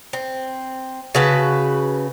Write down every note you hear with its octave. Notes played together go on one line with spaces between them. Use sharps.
C4
C#3 F#4 B4 A5